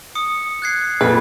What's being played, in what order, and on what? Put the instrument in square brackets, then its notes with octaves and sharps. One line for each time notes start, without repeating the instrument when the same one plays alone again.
[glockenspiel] D#6 C#7
F#6 G#6 C7
[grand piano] F2 A#2 [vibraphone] A4 B5 [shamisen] B4 F5